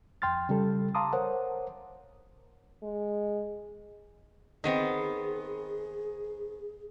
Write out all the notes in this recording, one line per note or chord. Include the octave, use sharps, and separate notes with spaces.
F2 G5 C6 F6 A6
C#3 G3 A4
F5 A5 A#5 C6 D6 D#6
A#4 C5 C#5 F#5
G#3
D#3 B3 C4 G#4 D#5